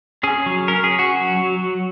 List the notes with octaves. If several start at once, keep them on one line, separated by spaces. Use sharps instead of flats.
C#4 G#4
F#3
C#4 A#4
G#4
C#4
F#4
F#3
F#3
F#3